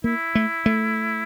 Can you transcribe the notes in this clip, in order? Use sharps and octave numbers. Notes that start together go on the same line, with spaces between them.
A#3 E4
A3
A3